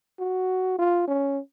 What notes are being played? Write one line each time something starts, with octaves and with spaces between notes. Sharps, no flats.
F#4
F4
C#4